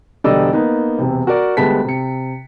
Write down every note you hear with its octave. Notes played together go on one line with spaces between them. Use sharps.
E1 D3 G3 D5 D#5 E6
A#3 B3 D#4
E1 C3
F#4 A#4 D5
D2 G3 G#3 B3 A5 B6
C3 C#7